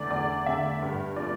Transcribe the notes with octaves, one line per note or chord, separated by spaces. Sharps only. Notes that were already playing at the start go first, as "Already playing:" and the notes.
Already playing: E2 D3 A3 D5
E2 D5
D3 A3 E5
G2
F3 A3 D5